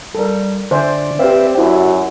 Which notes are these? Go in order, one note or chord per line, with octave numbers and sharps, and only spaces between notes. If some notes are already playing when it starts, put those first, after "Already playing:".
G3 A4 A#4
D3 C5 D5 E5 G#5
C4 G4 B4 E5 F5
F#2 E4 F#4